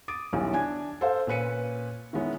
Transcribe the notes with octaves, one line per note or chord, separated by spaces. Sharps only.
D6 D#6 A6 D7
D#1 B1 E3 C#4
D4 G#5 G#6
A4 C5 F5
A#2 C#4 B4 C#7 D#7
D#3 E3 G#3 B3 C#4 E4